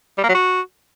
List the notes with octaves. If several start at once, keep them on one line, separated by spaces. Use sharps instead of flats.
G3
A#3
F#3
F#4